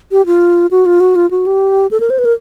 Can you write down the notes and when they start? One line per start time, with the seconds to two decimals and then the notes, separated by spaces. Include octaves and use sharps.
0.12 G4
0.26 F4
0.71 F#4
0.86 F4
1.00 F#4
1.16 F4
1.31 F#4
1.46 G4
1.91 A4
2.00 A#4
2.10 C5
2.19 B4
2.25 A#4